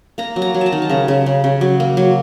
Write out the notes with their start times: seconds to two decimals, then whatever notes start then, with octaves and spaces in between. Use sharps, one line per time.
0.18 A#3 A#5
0.36 F#3
0.42 A#5
0.54 F#3
0.61 A5 A#5
0.72 D#3
0.82 A5
0.89 C#3 A#5
1.08 C#3
1.26 C#3
1.44 C#3
1.61 F#3
1.80 A#3
1.97 F#3